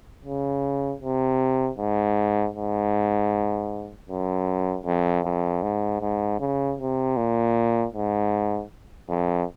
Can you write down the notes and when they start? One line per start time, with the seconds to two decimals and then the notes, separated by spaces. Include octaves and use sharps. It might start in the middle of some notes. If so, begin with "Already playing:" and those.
0.25 C#3
1.01 C3
1.78 G#2
2.55 G#2
4.09 F#2
4.85 F2
5.25 F2
5.63 G#2
6.01 G#2
6.40 C#3
6.79 C3
7.17 A#2
7.94 G#2
9.09 F2